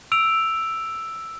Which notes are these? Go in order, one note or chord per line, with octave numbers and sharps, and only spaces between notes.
E6 D7 F7